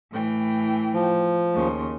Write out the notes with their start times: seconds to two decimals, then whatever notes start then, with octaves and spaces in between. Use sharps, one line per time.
0.11 A2 E3 G5
0.94 F3
1.53 D#2 C#3 C6